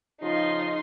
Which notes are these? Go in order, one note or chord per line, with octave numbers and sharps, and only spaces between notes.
C#3 F3 D#4 F4 C6